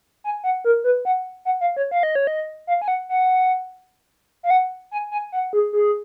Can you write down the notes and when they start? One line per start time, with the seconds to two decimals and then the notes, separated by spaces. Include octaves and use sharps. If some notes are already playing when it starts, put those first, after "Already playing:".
0.24 G#5
0.44 F#5
0.65 A#4
0.84 B4
1.05 F#5
1.45 F#5
1.61 F5
1.77 C#5
1.91 F5
2.03 D#5
2.15 C#5
2.27 D#5
2.67 F5
2.82 G#5
2.88 F#5
3.09 F#5
4.43 F5
4.50 F#5
4.91 G#5
5.11 G#5
5.32 F#5
5.53 G#4
5.73 G#4